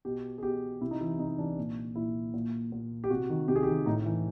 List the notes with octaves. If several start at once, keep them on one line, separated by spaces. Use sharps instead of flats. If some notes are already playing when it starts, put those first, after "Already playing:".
B2 G4
G#4
B2 G4
C3 E4
D#4
E3 E4
C3 D#4
E3 D4
A#2
A#2 E4
A#2
A#2
G4
C3 F#4
D#3
C3 G4
G#4
G4
D#3
A2 D#4
E3